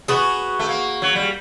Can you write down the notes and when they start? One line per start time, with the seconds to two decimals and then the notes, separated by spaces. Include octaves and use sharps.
0.08 B3 F#4 G#4
0.59 A3
0.69 A#3
1.02 F#3
1.16 G3